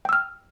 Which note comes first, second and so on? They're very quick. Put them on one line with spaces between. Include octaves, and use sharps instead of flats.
G5 E6 F6